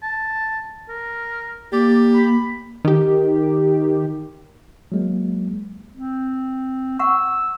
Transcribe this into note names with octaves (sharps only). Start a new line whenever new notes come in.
A5
A#4
A#3 G4 D5
B5
D#3 G4
F#3 G#3 A#3
C4
F#5 C#6 E6